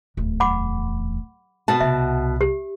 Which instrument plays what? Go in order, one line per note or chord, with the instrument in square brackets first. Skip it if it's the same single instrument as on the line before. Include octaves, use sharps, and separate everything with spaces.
[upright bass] D1 E2
[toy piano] F#5 B5 D6
[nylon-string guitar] B2 F#4 A5
[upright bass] C2 [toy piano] E5
[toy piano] G4